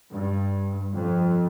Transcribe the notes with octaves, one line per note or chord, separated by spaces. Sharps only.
G2
F2